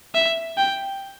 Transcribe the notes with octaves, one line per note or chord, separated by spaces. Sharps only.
E5
G5